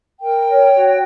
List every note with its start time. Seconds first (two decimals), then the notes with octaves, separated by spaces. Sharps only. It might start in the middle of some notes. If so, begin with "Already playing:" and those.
0.21 A#4 G5
0.47 C#5
0.74 F#4